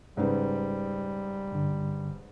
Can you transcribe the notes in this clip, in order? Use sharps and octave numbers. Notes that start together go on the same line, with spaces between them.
G#2 C#3 G3 B4
G2 D3